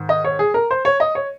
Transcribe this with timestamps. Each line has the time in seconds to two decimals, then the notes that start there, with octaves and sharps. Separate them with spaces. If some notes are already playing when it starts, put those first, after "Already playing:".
Already playing: G#2 D#3
0.09 D#5
0.24 C#5
0.39 G#4
0.54 A#4
0.71 C5
0.85 C#5
1.00 D#5
1.15 C#5